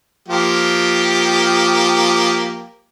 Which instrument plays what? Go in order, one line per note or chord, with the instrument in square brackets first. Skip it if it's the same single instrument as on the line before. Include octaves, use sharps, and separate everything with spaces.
[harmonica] F3 A#3 G4